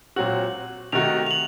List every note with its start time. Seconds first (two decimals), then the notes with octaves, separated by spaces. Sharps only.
0.16 A#2 F#3 C4 F#4 F#7
0.92 C3 D#3 A3 D#4 F#4 F7
1.27 F7
1.31 F#7